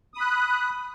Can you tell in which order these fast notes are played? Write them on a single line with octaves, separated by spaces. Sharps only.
D#6 B5 F#6